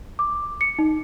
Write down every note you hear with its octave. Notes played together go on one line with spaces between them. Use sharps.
D6
C#7
D#4